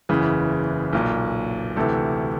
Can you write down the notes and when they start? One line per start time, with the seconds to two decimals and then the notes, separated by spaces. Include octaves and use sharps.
0.09 F#1 E2 C#3 E3 B4
0.93 B1 A#2
1.76 D2 C3 E3 A4